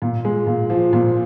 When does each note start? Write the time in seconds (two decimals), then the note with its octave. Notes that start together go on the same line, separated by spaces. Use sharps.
0.02 A#2
0.25 G#3
0.47 A#2
0.70 F3
0.93 A#2